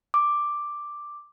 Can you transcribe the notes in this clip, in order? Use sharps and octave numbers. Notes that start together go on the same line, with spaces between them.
D6